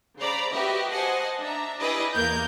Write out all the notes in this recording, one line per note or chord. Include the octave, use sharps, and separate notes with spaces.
C#3 C5 D5 A#5 B5
F#4 G4 B4 D#5 E5
C5 D#5 F#5 G#5 A5
D4 E5 A#5
E4 G4 G#4 B4 D5 D#5
E2 A#3 A#4 G6 G#6